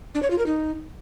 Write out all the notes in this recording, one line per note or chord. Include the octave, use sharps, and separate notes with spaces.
D4
C#5
F4
A#4
D#4